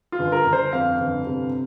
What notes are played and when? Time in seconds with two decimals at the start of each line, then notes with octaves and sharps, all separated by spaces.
0.12 F4
0.19 G1
0.32 A#4
0.46 G1
0.53 C5
0.73 F2 F5
1.00 G1
1.27 C3